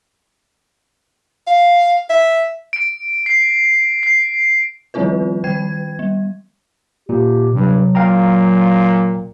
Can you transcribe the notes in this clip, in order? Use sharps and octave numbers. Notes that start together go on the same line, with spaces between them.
F5
E5
D7
C7
C7
D#3 F3 G3 C4 F4 B4
D#3 G5 G#6
G3
A#2 G4
G2 C3 F#3
A#2 F5 G5 A#5